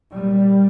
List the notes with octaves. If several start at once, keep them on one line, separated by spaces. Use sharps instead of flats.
A#2 G3